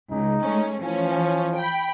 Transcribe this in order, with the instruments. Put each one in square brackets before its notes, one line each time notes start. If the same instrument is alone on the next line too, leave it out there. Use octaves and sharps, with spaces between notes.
[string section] C#2 [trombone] D#4
[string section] G#3 A3 C#4
[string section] E3 C#4 [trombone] F3
[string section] G5 B5